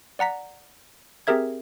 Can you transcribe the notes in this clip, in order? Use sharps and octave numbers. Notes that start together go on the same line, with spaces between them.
D5 F#5 A#5 B6
C4 G4 G#4 A#4 E5 G#6